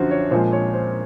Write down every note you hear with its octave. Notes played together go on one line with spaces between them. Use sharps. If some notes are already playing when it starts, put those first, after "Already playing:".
Already playing: F#2 D3 F3 F#4 C5
C#5
A#2 F3 G#3 C4 C5
C#5
C5